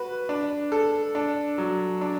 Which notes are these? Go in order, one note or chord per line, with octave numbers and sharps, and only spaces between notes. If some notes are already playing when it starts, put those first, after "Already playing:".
Already playing: F#4 B4
D4
A4
D4
F#3
D4